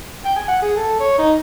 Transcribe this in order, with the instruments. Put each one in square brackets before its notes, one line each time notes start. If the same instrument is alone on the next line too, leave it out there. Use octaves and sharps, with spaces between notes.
[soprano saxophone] G5
G#5
F#5
G#4
A4
C#5
D#4